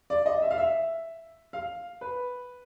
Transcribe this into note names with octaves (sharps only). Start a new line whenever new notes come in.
D5
D#5
E5
F5
E5
F5
B4